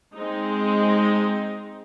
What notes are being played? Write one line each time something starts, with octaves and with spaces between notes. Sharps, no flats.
G#3 C4 D#4